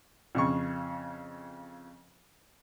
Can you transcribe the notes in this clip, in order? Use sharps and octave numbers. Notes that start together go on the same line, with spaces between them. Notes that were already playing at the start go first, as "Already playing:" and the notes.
F2 C#3 C#6